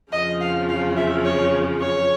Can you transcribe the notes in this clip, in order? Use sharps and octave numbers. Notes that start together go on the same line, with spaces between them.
F2 C#3 F3 D#5
F5
F5
E5
C#5
C#5